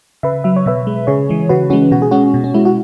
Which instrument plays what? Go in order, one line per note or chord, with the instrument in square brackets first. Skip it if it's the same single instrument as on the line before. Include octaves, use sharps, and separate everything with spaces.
[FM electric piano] C#3 B4 E5
F#3 E5
C#5
B2 B4 E5
G#3
C#3 G#4 C#5
E3 G#3
C#3 F#4 B4
E3 G#3 C#4 F#4
B2 F#4
G#4
G#3 C#4 F#4
B2
C#4
G#3 E4
F#4